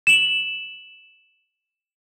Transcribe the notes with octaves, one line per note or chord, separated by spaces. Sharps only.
E7 F#7